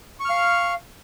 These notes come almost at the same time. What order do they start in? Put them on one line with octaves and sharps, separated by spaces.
C#6 F6 F5